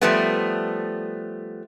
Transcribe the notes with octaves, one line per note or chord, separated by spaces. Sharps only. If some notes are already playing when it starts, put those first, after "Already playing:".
F3 G3 A3 B3